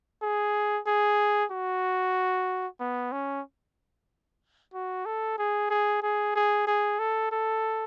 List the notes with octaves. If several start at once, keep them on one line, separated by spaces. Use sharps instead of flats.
G#4
G#4
F#4
B3
C#4
F#4
A4
G#4
G#4
G#4
G#4
G#4
A4
A4